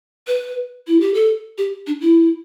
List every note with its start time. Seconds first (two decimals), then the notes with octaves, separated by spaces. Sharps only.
0.27 B4
0.87 E4
1.00 G4
1.14 A4
1.58 G4
1.87 D4
2.01 E4